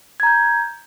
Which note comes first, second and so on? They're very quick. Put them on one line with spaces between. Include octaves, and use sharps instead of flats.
G#6 A#5 G6